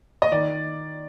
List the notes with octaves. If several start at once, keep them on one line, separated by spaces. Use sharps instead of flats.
D#5
D#3 D5